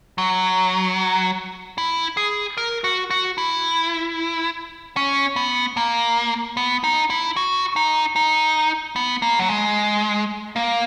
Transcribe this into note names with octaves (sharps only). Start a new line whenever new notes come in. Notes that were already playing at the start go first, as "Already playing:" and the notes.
F#3
E4
G#4
A#4
F#4
F#4
E4
C#4
B3
A#3
B3
D#4
E4
F#4
D#4
D#4
B3
A#3
F#3
G#3
A#3